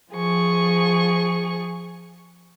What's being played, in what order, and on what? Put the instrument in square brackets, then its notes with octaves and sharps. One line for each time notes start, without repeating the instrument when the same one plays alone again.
[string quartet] F3 G#4 C#6